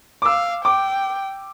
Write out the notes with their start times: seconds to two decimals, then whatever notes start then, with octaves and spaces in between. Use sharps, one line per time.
0.22 D6
0.25 F5 E6
0.65 G5 D6